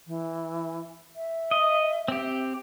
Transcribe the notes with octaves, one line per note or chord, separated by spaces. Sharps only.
E3
E5
D#5
C4 G4